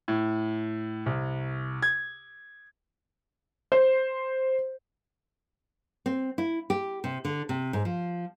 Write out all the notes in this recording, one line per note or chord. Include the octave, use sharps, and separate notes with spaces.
A2
C2
G#6
C5
C4
E4
G4
C3
D3
C3
G#2
F3